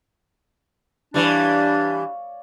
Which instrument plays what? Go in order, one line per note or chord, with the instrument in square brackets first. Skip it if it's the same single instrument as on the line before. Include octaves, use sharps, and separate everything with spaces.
[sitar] E3 G3 [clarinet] D4 [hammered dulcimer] C#5 D5 F5